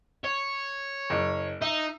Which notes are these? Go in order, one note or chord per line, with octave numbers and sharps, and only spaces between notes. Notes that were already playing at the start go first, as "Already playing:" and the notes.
C#5
F#1
D#4 E5